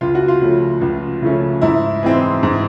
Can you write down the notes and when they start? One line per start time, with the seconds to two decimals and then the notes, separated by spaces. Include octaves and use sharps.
0.01 C#2 F4
0.15 F#4
0.28 F4
0.41 C#3 F3 A3 C#4
0.81 C#2
1.22 C#3 F3 A3 C#4
1.61 G#2 E4
2.03 E3 G#3 C4
2.43 G#2